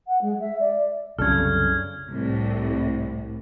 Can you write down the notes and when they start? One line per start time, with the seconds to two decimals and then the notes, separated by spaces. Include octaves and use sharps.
0.07 F#5
0.21 G#3
0.40 E5
0.60 D5
1.19 C2 F#2 C#3 C#4 D4 A4 F6 G#6
2.08 C2 A2